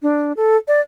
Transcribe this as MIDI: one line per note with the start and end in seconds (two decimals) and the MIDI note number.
0.02 0.32 62
0.37 0.56 69
0.68 0.81 74